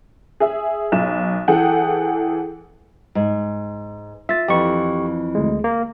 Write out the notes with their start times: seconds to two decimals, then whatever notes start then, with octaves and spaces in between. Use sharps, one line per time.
0.40 G#4 E5
0.92 B1 E7
1.48 E3 G#4 A4 F#5 G5
3.15 G#2
4.29 F4 E5 A6
4.48 F2 E3 G4 C#6
5.35 D2 G#3
5.64 A#3